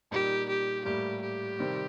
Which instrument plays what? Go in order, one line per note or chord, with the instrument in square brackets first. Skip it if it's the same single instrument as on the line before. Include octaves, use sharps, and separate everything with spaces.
[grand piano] A#2 G3 A#3 D#4 [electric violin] G4
[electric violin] G4
[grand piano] A2 G3 A#3 [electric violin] G4
[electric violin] G4
[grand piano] C3 D#3 G3 C4